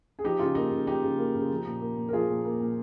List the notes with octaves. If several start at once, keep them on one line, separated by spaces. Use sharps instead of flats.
G#4
F3 D#4 G4
C#3 F4
A#3 D#4
C#3
F3 D#4 G4
C#3
A#3
C#3
F3
A#2
A#3
A#2
A#4
F3 F4 G#4
A#2
A#3
A#2